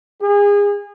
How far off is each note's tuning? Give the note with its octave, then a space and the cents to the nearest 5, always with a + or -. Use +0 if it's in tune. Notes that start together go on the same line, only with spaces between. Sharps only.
G#4 -30